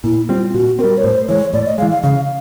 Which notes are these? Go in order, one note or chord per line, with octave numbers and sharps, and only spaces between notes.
A#2 E4
G3 C4 F4
A#2 F#4
G3 C4 A#4
C#5
A2 C5
E3 G#3 C#5
A2 D5
D#5
E3 G#3 F5
F5
C#3 F5